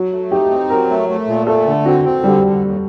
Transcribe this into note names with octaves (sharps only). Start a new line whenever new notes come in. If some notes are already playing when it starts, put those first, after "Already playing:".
Already playing: F#3 F#4
A3
D#4 G4
C4
F#3 A#4
A3
A3
A#2
A3 A4
D3
C4 F#4
C4
D3 G3
D3
D#2